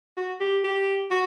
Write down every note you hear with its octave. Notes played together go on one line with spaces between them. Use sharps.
F#4
G4
G4
F#4